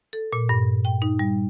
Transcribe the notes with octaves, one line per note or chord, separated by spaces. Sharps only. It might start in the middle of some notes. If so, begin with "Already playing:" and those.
A4
A#2
G2
G5
D#4
G3